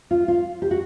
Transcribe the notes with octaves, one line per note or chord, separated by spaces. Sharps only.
F4
F4
G4
F#4